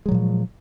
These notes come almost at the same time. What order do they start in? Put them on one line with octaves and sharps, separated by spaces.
G#3 F#3 A#2 F3